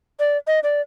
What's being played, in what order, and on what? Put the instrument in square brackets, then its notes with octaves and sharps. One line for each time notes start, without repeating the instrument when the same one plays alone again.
[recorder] D5
D#5
D5